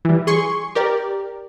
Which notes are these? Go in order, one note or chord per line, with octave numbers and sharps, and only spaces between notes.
E3 G3
G#4 C6 C#6
G4 A#4 D5